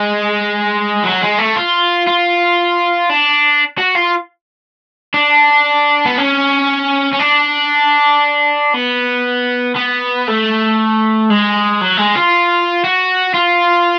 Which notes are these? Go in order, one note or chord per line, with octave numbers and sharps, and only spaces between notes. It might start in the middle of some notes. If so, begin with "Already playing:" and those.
Already playing: G#3
F#3
G#3
A3
F4
F4
D4
F#4
F4
D4
B3
C#4
C#4
D4
B3
B3
A3
G#3
F#3
G#3
F4
F#4
F4